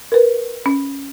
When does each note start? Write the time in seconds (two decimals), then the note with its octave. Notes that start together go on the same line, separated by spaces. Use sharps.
0.12 A#4 B4
0.66 C#4